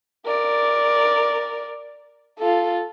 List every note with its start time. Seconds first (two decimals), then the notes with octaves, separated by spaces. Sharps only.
0.26 A#4 D5
2.39 F4 A4